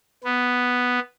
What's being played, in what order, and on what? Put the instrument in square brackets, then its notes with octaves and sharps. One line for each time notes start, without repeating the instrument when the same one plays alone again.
[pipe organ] B3